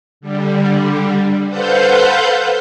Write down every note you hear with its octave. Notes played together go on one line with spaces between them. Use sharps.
D3 G3
A4 B4 C5 F5 F#5 G6